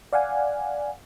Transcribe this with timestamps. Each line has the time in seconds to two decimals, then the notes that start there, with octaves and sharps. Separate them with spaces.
0.13 D5 F5 F#5 G#5